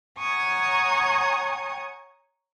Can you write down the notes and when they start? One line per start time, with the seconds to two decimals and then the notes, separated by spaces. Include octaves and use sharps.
0.19 C#5 F#5 G#5 A#5 C#6 D#6